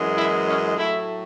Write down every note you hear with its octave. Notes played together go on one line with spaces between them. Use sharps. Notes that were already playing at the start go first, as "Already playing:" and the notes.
Already playing: F#2 E3 G#3
E4
C#4
A2 F#3 A3 E4